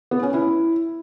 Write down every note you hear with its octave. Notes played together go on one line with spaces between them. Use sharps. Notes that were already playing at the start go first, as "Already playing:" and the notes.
B3
C#4
E4